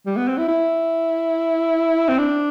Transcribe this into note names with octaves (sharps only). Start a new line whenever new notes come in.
G3
B3
C4
E4
E4
C4
D4